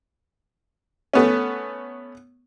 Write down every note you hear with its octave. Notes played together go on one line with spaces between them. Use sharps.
A3 B3 C#4